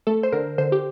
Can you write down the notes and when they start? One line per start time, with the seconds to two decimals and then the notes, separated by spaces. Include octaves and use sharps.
0.07 A3 A4
0.23 C5
0.32 D3 A#4
0.58 D3 C5
0.72 G4